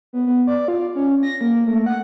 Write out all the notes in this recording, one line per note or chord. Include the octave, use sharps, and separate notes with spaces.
B3
B3
D5
F4
C#4
A#6
A#3
A3
F#5